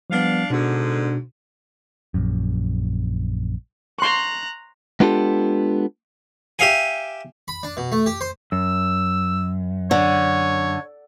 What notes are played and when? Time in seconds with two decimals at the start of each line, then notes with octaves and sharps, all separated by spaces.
0.10 F3 G3 B3 D4 F5
0.50 G#2 B2 D3 D4 F#4
2.14 A#1 F#2
3.99 A#5 C6 C#6 F#6
5.00 G#3 B3 D4 F4 G4 A4
6.59 G4 E5 F5 G#5
7.48 B5
7.63 D4
7.77 B2
7.92 A3
8.06 G4
8.21 C5
8.52 F#2 E6
9.91 D3 C#5